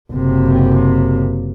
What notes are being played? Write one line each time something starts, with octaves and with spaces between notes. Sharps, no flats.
F#1 C3